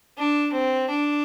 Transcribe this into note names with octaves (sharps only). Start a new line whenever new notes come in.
D4
C4
D4